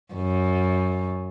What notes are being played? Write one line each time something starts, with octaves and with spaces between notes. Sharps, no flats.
F#2